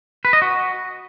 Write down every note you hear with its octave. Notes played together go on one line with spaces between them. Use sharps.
B4
D#5
F#4